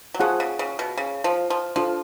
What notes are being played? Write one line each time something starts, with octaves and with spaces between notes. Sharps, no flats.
F#3
F3 F4 G#4 C#5 F#5
C#3
C#3
B2
C#3
F3
F3
F3 D4 F4 A4 F5